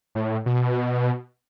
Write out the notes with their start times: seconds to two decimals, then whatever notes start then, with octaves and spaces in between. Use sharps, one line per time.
0.15 A2
0.46 B2